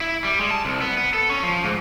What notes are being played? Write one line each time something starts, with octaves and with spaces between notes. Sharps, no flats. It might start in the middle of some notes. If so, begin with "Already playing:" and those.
E4
G3
G#3
A5
C2
B3
B3
A4
C#4
F3
G#2